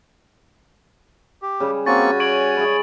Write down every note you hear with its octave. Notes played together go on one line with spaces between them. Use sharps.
G4
C#3 G3
A#3 C4 C#4 F#4 G#5 C#6 A6
C#5 C#6 D7 F#7
E4 G#4